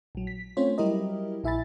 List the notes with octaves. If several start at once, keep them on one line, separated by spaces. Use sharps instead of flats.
A#1 F#3
B6
A3 C4 C#4 F4 C5 C#5
F#3 G3 E4 G4 A#4 D#5
A#1 E4 E5 G#5 B5 A6